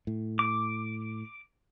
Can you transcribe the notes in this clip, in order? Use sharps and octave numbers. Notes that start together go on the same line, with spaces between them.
A2
D6